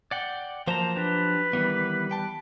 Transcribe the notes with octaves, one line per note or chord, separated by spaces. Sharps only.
D5 F#5 G5
F3 F#3 A#3 C5 A5 A#5
D4 G4 B4
D#3 E3 G3 B3
G5 A5